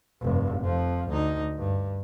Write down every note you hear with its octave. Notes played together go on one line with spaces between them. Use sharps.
F1 G2
F2 F3
D2 D#4
G2